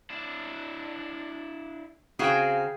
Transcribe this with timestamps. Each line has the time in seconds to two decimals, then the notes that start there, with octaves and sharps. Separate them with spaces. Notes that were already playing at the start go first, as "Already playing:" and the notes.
0.10 D4 E4
2.19 C#3 C4 F#4 G#4 F5 G5